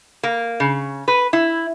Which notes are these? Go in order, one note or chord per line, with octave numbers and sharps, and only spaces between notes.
A#3
C#3
B4
E4